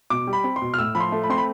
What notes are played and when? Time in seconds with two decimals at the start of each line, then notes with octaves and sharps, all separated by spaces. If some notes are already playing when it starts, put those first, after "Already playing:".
0.10 B2 D6
0.27 G3
0.33 B5
0.44 C4
0.56 C6
0.62 B2
0.74 F6
0.78 A2 E6
0.95 F3 B5
1.00 C6
1.12 A3
1.24 B5
1.29 C4 C6
1.38 B5